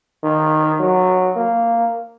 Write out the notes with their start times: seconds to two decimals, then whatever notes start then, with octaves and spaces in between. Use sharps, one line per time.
0.23 D#3
0.80 F#3
1.37 A#3